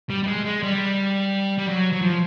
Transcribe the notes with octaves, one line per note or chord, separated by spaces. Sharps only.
G3
G3
G#3
G#3
G3
G3
F#3
F#3
F3